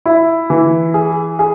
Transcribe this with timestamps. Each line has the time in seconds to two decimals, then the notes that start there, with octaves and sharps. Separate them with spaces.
0.06 E4
0.50 E3
0.94 G#4
1.39 G#4